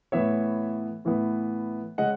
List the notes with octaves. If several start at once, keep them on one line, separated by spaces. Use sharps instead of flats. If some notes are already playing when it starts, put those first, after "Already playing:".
A2 E3 B3 C#5 E5
A2 E3 B3
C#3 G#3 C#4 D#5 F#5